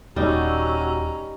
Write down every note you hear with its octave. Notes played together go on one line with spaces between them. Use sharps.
D#1 G3 C#4 D#4 F#4 A#5 E6